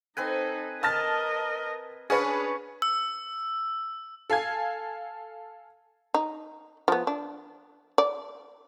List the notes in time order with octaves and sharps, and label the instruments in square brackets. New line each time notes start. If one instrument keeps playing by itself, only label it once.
[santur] C4 B4 G#5 [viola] D#4 A4
[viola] A#4 D#5 [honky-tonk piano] A5 F6 A6
[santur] C#4 A5 C#6 [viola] D4 [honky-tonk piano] G#4 B4
[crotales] E6
[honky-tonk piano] A4 F5 G#5 G#6
[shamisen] D#4
F3 B3
D4
D5